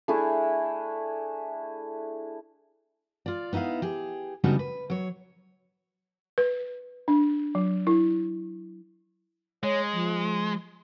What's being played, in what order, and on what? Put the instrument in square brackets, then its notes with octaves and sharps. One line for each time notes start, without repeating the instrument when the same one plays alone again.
[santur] A3 D4 E4 G#4
[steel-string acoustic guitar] F4 D5
B3 D#4 E4 D5 F5
G4 G#4
C#3 G3 B3 D4 D#4 F#4
B4
F#3 C#5
[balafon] B4
D4
F#3
E4
[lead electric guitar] G#3 [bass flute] C#5
[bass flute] F3